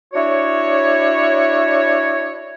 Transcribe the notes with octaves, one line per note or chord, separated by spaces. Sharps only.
D4 E4 F#4 C#5